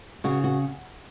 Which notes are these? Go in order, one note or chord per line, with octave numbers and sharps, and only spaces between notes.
C#3 F#4
F#4